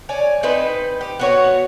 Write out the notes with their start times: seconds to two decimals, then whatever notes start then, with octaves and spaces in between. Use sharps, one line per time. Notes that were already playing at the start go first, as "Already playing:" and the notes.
0.09 C#5 D5 G#5
0.43 C4 D#4 B4
1.01 G4
1.19 B3 F#4 C#5